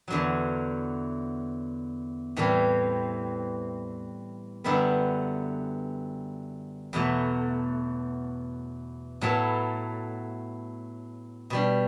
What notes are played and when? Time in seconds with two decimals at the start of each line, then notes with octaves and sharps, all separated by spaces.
0.08 E2 D3 F#3
2.37 A2 E3 G3 C4
4.64 F#2 D3 G3 B3 E4
6.93 E2 B2 F#3 A3
9.21 A2 F#3 B3 E4 A4
11.50 B2 G3 D4